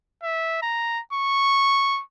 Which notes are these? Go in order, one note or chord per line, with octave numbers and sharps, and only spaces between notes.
E5
A#5
C#6